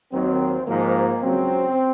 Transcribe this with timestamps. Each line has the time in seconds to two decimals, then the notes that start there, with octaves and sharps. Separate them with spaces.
0.12 D#2 D#3 F#3 C4
0.67 G#2 F3 A#3
1.22 C#2 C#3 F#3 C4